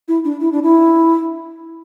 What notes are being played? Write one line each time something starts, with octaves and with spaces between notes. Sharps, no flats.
E4
D4
E4
D4
E4